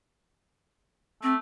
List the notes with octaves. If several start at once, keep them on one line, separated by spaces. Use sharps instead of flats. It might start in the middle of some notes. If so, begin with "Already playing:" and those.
A3 C4